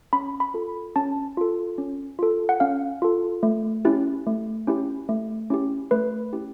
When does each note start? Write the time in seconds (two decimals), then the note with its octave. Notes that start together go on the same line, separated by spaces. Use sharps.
0.13 C#4 B5
0.40 B5
0.54 F4 A4
0.96 C#4 A5
1.37 F4 A4
1.78 C#4
2.19 F4 A4
2.49 F#5
2.60 C#4 F5
3.02 F4 A4
3.43 A3
3.85 C#4 E4 G4
4.27 A3
4.67 C#4 E4 G4
5.09 A3
5.50 C#4 E4 G4
5.91 A3 B4
6.33 C#4 E4 G4